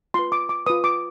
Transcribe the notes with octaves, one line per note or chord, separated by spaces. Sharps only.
F4 B4 C6
D6
D6
F4 B4 D#6
D6